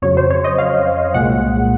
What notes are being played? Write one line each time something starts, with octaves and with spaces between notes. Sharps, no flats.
F2 C#3 F#3 C#5
C5
C#5
D#5
F5
C2 A#2 G#3 F#5